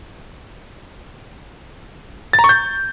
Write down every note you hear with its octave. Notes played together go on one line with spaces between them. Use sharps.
A6
A#5
C#6
G6